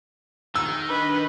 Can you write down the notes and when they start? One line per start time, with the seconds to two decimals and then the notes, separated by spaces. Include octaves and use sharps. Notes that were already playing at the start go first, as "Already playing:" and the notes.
0.55 D#3 E6
0.90 D4 A#4 B4 D#5